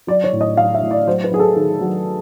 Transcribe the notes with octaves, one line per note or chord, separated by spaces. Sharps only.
F#3 D5
C#5
A2
D#5
F#3 F5
E5
A2
D5
F#3 C5
B4
F#3 G#4
A4
D#3 G#4
F#3